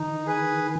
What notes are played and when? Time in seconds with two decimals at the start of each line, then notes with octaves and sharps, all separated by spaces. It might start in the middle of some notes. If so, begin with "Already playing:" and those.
Already playing: D#3 D#4
0.26 G#4 B4 G#5